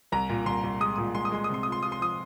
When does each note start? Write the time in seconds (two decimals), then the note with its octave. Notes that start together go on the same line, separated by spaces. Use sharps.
0.12 C2 A#5
0.29 A#2
0.46 C2 C6
0.64 C2
0.80 G#3 D#6
0.96 A#2 D#6
1.15 G#3 C6
1.25 D#6
1.32 G#3 C6
1.44 D#6
1.49 C3 C6
1.63 F4 D#6
1.72 C6
1.83 F4 D#6
1.92 C6
2.00 F3 D#6